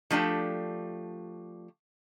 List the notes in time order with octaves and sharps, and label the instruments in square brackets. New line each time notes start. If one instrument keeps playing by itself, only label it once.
[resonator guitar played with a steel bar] F3 A3 D4 G4